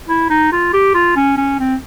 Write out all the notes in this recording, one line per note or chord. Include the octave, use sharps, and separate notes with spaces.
E4
D#4
F4
G4
F4
C#4
C#4
C4